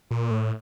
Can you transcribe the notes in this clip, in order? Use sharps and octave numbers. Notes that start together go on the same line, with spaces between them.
A#2
A2